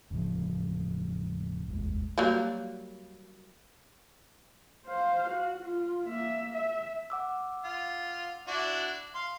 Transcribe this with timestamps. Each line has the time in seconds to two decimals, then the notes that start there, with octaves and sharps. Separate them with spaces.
0.10 E1 A2 C#3 F3
1.66 D#1 G#1 F2 G#3
2.18 F#3 G3 A#3
4.87 C5 F5
5.30 F#4
5.63 F4
6.08 A#3 E5
6.54 E5
7.10 F#5 D6 E6
7.64 F4
8.48 D4 E4 F#4
9.15 F5 C6